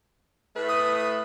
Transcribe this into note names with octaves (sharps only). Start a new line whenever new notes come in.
A2 A3 B4
D#6